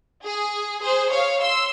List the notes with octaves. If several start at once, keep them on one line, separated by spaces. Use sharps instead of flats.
G#4
G#4 C5
C#5 F5
C6 E6